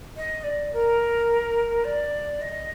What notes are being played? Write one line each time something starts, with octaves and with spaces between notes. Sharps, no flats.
D#5
D5
A#4
D5
D#5